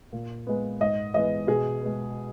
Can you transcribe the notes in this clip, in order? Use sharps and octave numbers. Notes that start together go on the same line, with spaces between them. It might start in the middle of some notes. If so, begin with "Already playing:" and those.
A#2
G#3 B3
G#2 D#5
E3 G#3 B3 D#5
B2 G#4
G#3 B3